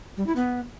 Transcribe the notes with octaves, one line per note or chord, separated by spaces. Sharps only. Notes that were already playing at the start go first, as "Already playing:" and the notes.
G3
E4
B3